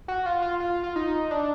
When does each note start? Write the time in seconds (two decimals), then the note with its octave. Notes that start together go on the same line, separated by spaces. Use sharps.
0.08 F#4
0.26 F4
0.42 F4
0.60 F4
0.83 F4
0.96 D#4
1.31 D4